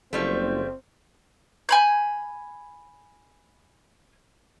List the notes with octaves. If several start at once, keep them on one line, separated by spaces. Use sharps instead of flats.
F#1 F3 G3 A3 C4
G#5 B5 G6